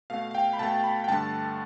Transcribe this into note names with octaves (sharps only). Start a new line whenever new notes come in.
B2 A3 F5
F5
G5
B5
B2 A3 A5
B5
G5
G2 D3 A3 A5